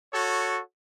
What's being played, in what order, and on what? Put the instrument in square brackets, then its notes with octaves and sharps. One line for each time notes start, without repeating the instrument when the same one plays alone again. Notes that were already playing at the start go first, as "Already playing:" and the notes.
[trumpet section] F#4 A4 C#5